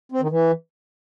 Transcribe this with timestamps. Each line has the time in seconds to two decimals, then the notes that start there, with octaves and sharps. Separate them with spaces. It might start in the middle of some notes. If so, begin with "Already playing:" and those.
0.12 C4
0.21 D#3
0.30 E3